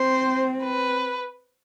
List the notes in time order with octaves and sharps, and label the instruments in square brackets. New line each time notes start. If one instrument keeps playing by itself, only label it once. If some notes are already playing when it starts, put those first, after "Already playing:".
Already playing: [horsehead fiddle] C4 [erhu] C5
[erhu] B4